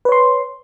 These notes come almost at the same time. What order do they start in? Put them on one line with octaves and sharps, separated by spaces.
B4 C#5 C6